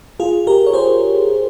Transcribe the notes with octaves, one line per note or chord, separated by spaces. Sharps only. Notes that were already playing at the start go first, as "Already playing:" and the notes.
F4 G#4
G4 A#4
C#5
G#4 C5